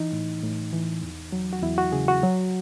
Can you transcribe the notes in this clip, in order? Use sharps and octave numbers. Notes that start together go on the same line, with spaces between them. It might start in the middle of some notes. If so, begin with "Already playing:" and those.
Already playing: E3 D#4
A2
A2
E3
E2
F#3
F#4
E2 E4
F#4
C#3 G#4
F#4
F#3